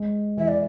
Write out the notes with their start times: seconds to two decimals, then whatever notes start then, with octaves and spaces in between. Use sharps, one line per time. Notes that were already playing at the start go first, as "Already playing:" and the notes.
Already playing: G#3
0.37 E3 E5
0.48 D5